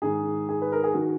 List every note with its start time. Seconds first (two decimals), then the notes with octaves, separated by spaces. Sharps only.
0.02 G#2 D#3 G#4
0.49 G#4
0.62 B4
0.72 A#4
0.84 G#4
0.94 D#3 F#4